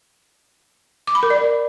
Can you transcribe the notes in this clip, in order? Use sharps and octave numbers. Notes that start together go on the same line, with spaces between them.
D6
B5
A#4
D5